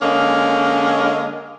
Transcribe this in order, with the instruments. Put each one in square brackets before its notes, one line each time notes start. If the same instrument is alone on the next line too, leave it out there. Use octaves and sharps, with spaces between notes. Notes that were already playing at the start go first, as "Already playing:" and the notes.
[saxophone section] D3 G#3 A#3 C#4